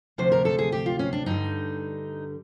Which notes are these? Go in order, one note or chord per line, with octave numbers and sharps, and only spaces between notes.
D2 C3 F3 C5
A#4
A4
G#4
G4
F4
C#4
D4
G2 D3 G3 D#4